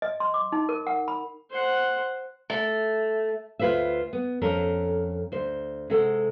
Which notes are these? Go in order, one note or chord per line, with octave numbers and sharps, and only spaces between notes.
D#5
C6
D6
D#4
A#4
F#5
B5
C5 F#5
A3
D2 F4 B4 C5 E5
B3
F2 C#4 A4 A#4
D2 C5
C3 G#3 A4 F#5